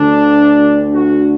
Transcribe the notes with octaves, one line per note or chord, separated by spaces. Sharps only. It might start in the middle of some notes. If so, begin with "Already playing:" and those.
Already playing: D2 D3 D4
F#4